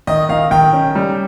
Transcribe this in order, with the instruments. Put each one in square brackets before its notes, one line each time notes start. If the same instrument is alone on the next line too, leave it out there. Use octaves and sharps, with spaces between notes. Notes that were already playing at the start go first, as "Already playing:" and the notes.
[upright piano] D#3 [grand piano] D#5
[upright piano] D#3 [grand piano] F5
[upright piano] D#3 [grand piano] G5
[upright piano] C#4
G3